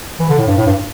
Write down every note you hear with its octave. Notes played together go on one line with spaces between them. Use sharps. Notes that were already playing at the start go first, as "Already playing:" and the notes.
E3
D3
A2
G2
A2
G2